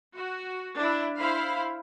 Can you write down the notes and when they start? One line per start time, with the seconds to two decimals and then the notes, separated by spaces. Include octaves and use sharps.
0.16 F#4
0.76 D4 E4
1.18 E4 C5 F5 B5